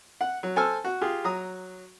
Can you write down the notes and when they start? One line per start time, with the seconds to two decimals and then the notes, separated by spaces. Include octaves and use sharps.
0.21 F#5
0.43 F#3
0.56 A4 C5 G#5 E6 F6
0.84 F#4
1.01 F4 G4 G#4
1.24 F#3 A#5 D#6